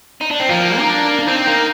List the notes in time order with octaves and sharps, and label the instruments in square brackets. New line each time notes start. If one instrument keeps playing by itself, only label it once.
[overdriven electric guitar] D#4
D4
C4
[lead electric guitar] F3 [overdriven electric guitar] A#3
[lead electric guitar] D#4
D4
D4
[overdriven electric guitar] C4 [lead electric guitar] D#4
[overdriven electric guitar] A#3